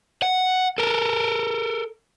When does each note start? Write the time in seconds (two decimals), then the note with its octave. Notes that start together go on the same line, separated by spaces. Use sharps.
0.22 F#5
0.78 A4 A#4